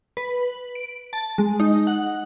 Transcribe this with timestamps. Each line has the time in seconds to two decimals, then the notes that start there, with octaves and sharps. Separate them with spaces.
0.17 B4
0.75 D7
1.13 A5
1.38 G#3
1.60 D#4
1.87 F#5